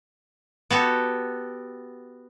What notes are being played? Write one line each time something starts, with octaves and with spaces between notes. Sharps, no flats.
B3 F#4 G4 A4